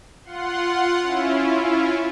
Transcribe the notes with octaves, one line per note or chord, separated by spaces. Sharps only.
F4 F#5 C6
C#4 E4 F4